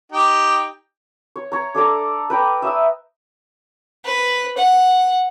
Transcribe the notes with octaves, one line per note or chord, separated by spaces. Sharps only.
D#4 G4 G5
C#5
C#5 A#5
D4 A4 D5 A#5
B4 G5 A#5
E5 D#6 E6
B4
F#5